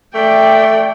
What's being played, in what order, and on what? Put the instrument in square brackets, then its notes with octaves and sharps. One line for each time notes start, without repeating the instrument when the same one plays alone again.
[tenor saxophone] A3 [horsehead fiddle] D5 G5